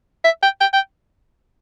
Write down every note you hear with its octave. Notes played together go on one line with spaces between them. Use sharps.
E5
G5
G5
G5